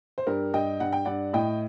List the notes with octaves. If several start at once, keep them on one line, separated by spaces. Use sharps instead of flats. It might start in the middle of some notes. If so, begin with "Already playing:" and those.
C5
G2 G4 A#4
G2 D#5 G5
G2 F#5
G5
G2 D5 F#5
A2 D#5 G5